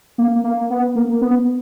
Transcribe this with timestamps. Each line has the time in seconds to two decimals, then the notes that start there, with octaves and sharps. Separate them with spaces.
0.18 A#3
0.44 A#3
0.70 B3
0.96 A#3
1.21 B3